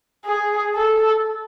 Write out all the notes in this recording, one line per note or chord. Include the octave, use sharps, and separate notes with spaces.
G#4
A4